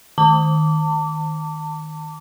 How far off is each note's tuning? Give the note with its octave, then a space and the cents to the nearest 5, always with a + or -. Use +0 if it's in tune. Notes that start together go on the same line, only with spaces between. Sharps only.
D#3 +0 A5 +35 D6 -20